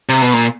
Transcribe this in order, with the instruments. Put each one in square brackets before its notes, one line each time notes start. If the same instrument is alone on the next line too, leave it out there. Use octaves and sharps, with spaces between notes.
[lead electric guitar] C3
B2
A#2